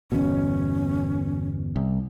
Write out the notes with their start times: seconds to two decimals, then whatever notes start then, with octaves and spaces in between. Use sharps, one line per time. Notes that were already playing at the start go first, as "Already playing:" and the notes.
0.12 G1 E2 B2 C#4
1.76 C2